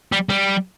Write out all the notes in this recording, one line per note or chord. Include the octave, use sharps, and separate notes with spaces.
G3
G3